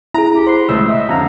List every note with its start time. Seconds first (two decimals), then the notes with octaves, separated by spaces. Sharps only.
0.14 E4 G#4 A#5
0.35 C2 C#4 G4
0.47 B4 C5 F#5 C6
0.69 C#2 A2 A3 E6
0.87 D#5 E5
1.09 F2 D3 F5 A#5